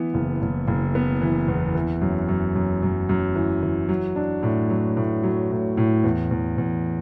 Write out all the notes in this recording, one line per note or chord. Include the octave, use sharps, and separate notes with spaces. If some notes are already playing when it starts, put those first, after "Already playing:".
Already playing: E3 B3
F#1
F#1
F#1
B3
E3
E2
E3
F#2
F#2
F#2
F#2
F#2
E3
E3
F#3
D4
A2
F#3
A2
F#3
A2
A2
E2
E2
E2